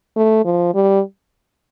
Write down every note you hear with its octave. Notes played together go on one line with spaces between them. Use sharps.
A3
F3
G3